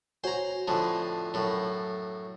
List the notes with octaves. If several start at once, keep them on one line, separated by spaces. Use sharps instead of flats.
F#4 C5 C#5 G#5 A#5
F2 A2 D3 A5
F#2 A2